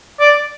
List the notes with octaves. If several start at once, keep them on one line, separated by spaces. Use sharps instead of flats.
D5